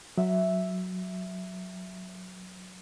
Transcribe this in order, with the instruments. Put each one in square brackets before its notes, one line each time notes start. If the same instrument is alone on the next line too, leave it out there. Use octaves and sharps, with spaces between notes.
[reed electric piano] F#3 [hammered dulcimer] E5